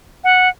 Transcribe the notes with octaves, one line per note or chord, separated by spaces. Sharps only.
F#5